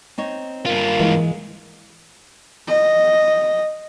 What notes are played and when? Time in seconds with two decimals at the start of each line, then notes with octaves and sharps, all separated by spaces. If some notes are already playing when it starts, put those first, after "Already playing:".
0.18 C4 D#4 C#5
0.66 G2 A#3 F4
1.00 E3 G#3
2.67 D#5